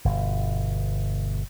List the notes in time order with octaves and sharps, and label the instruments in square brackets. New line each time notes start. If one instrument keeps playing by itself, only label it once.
[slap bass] G1 B2